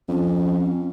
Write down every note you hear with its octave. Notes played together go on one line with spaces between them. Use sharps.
F2 C#4